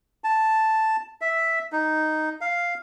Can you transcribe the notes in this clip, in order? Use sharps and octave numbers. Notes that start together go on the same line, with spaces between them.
A5
E5
D#4
F5